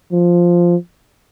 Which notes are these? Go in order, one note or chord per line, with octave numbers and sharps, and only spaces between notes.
F3